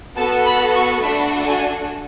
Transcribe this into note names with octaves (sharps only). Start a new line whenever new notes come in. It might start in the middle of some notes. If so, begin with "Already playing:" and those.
B3 F#4 A4 A5
B5
C#6
A3 D4 F#4 A4 B5
G#5